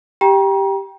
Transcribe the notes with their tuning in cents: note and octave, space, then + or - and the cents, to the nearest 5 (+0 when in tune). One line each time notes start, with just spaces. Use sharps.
G4 +0 G5 +0 A#5 +35